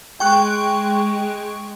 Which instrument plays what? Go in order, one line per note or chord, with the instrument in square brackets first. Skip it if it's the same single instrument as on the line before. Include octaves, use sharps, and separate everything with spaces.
[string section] G#3 [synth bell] G5 C#6 F#6